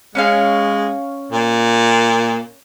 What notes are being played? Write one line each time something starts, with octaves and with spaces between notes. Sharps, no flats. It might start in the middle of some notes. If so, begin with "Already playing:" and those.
G#3 C#4 C#5 F5
A#2